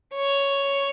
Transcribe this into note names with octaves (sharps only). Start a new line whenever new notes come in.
C#5